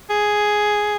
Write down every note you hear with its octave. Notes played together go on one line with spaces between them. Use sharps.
G#4